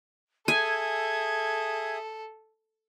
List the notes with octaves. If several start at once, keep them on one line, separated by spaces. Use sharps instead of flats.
G#4 A4 E5 G#5 D#6 G#6